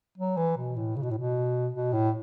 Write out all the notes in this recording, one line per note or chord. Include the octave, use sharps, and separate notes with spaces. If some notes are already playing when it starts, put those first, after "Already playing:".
F#3
E3
B2
A2
C#3
B2
A2
B2
B2
A2